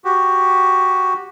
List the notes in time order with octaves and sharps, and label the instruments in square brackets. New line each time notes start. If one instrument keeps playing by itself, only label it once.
[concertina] F#4 G4